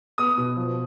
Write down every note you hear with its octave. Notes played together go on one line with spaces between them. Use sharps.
B3 D#6
B2
F3